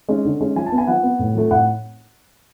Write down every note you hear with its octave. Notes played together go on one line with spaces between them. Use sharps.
G#3 C#4
D3
G#3 C#4
F3 G#5
A5
B3
G#5
F3 F#5
B3
A2
F3 A3
A2 F#5